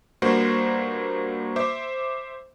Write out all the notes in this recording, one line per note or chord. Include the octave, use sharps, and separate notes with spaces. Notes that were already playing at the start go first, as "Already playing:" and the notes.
G2 A#3 F#4 C5
C5 E5 D6